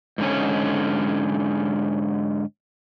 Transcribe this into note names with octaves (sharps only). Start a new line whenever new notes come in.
G#2 D3 C#4